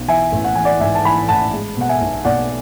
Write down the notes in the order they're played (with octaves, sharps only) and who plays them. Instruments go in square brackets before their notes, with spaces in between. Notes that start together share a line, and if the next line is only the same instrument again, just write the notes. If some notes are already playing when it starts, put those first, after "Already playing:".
Already playing: [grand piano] B1
E3 E5 G#5
A1
F#5
E3 G#5
D5 F#5
G#2 E5 G#5
A5
E3 G#5 B5
A1 F#5 A5
G#3
B2 F#5
E5 G#5
B1
B1 D5 F#5